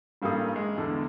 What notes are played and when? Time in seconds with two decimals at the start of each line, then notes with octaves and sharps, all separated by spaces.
0.22 A1 G2 G3 A#3 A4 D#6
0.56 G#3
0.78 E2 D3